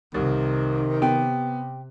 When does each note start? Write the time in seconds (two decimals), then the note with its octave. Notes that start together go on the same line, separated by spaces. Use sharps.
0.14 C2 C3 D#3
1.02 B3 G4